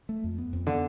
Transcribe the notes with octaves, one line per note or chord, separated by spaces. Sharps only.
A3
F2
B3
F2
D3 B3